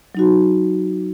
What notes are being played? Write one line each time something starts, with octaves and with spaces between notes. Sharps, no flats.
F#3 D#4 F#4